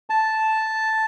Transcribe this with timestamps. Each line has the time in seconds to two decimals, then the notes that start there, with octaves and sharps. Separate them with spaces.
0.10 A5